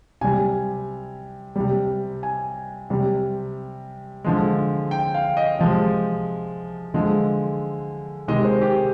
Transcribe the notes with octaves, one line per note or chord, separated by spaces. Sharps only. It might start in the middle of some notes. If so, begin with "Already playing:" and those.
C3 G3 G#5
C3 G3
G#5
C3 G3
D3 F3 G#3
G5
F5
D#5
C3 F3 G#3 D#5
D3 F3 G#3
C3 D#3 G#3 D#5
C5
G4